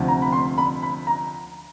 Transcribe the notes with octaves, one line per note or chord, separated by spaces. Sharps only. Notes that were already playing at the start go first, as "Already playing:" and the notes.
Already playing: D2 C3 F3
A#5
B5
C6
B5
B5
A#5